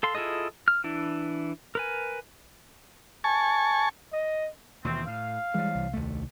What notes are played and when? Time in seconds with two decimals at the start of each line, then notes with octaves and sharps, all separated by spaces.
0.03 A4 F5 C6
0.15 E4 F4 G#4 A4 D#5
0.68 F6
0.84 E3 D4 E4
1.75 A#4 B4 G#5
3.24 G#5 A5 C#6
4.13 D#5
4.85 D#2 B2 E3 A3 C4
5.07 A2 F5
5.54 E3 G3 G#3
5.75 C2
5.94 D#2 A3